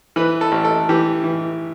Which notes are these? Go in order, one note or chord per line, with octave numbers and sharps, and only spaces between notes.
E3 B4
A4
A1
A4
E3 G4
E3